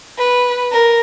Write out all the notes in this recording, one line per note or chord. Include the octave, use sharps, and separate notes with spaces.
B4
A#4